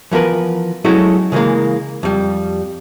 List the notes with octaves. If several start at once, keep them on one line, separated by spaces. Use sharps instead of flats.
E3 F3 B3 A#4 B4
F#3 G#3 A3 C#4 E4 F#4
C#3 E3 G3 G#3 A#3
F2 G3